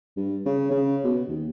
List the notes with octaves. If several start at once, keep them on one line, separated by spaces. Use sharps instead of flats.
G2
C#3
C#3
B2
D#2